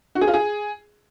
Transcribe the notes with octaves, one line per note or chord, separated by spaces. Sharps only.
F#4
G#4
F4
G#4